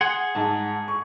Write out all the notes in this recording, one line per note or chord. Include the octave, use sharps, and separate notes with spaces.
G#4 F#5 C6
G#2 A5
C#6